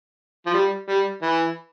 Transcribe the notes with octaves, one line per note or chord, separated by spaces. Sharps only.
F3
G3
G3
E3